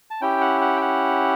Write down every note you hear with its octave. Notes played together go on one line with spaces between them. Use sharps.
A5
C#4 E4 G4 G5
F#5
F#5
G5
F#5